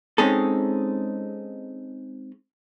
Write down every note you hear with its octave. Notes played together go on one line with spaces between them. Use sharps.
G#3 C4 C#4 D#4 G#4 A4